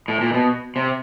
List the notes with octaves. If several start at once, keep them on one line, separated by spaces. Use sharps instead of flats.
A2
A#2
B2
C3